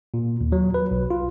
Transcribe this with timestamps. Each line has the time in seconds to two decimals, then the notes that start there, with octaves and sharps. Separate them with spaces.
0.14 A#2
0.41 D#2
0.52 F#3
0.74 B4
0.91 B1
1.11 F4